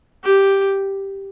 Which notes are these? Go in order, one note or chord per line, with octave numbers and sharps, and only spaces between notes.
G4